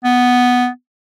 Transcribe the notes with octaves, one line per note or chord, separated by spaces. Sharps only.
B3